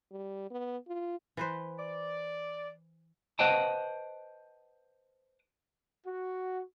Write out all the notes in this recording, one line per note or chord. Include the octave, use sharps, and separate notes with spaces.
G3
B3
F4
E3 B4 C5
D5
B4 C5 D#5 F#5 G5 A5
F#4